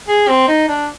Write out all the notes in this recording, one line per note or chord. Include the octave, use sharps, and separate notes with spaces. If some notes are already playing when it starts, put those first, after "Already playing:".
G#4
C4
D#4
D4